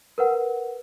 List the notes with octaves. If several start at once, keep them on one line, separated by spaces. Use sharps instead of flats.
A#4 B4 F#5